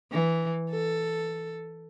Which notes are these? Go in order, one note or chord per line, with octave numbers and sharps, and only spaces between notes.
E3
A4